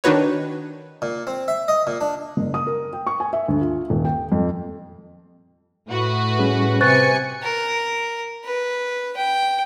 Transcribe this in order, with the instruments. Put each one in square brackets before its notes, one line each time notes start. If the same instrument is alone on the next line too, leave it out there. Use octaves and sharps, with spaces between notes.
[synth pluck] D#3 D4 D#4 F#4 B4 C#5
[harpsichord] A#2
C4
E5
D#5
A#2
D4
[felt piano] F#1
D#6
A#4
G5
C#6
G#5
E5
D2
F4
D#1
G5
F2
[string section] A2 F#4 B4
[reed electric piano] G3 C#4 G#4
[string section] C3 G#5 C#7 [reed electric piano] B4 C5 [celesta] C#6 F#6 A6
[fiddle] A#4
B4
G5